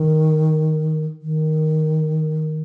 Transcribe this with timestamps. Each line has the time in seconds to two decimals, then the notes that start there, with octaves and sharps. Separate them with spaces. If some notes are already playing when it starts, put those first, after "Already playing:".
Already playing: D#3
1.22 D#3